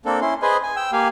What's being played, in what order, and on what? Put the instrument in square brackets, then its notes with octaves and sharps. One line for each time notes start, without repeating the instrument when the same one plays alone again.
[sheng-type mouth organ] A#3 C4 D4 A4
C#4 E4 C6
G#4 B4 C5 D#5 G#5
G#5
G5 E6
A#3 G4 F5 G#5